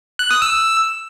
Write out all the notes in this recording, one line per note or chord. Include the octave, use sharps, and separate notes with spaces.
F#6
D#6
E6